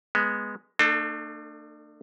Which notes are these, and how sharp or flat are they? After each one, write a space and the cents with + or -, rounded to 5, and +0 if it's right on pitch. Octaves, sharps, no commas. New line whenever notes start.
G#3 +0 B3 -5
A3 +45 D4 +40 A4 +0